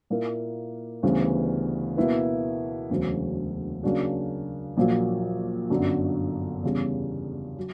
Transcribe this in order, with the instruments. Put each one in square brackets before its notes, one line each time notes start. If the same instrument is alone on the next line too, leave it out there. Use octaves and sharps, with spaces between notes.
[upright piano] A#2 A#3 E4 A#4
D2 C#3 E3 G3 B3
B2 A#3 E4 B4
E1 D2 C#3 F#3
C#3 F#3 A#3 D4 F#4
A#1 A#2 F#3 A#3
G1 F#2 D3 F#3
E2 C#3 G3
F#3